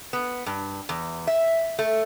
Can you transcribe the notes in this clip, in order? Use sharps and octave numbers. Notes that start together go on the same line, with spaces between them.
B3
G2
E2
E5
A3